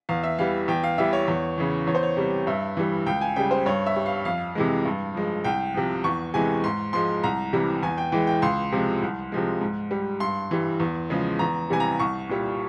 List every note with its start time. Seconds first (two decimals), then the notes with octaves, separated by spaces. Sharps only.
0.09 E2 F5
0.24 E5
0.39 E3 G3 F5
0.68 E2 G5
0.84 F5
0.98 E3 G3 E5
1.13 C#5
1.28 E2
1.58 C#3 E3
1.87 E2 C#5
1.95 C5
2.03 C#5
2.17 C3 G3
2.47 G2 E5
2.77 E3 G3
3.06 C#2 G5
3.21 G#5
3.36 C#3 G3 G5
3.51 C5
3.66 G2 C#5
3.86 E5
3.96 G3
4.06 F5
4.25 F2 F5
4.55 C3 E3 G#3
4.85 G2
5.14 F3 G#3
5.44 C2 G5
5.74 C3 F3
6.04 E2 C#6
6.34 C3 E3 G#3 G#5
6.64 G#2 C6
6.93 F3 G#3 C6
7.23 C2 A#5
7.53 C3 E3 G3
7.83 E2 G#5
7.98 G5
8.12 E3 G#3 G5
8.27 G5
8.42 C#2 C6
8.72 C3 F3 G#3
9.02 C2
9.32 C3 F3 G#3
9.61 G#2
9.91 G3
10.20 G2 C6
10.51 E3 G3
10.80 E2
11.10 C#3 F3 G#3
11.39 E2 A#5
11.70 C3 E3 G3 G#5
11.80 A#5
11.99 C2 C#6
12.29 A#2 G3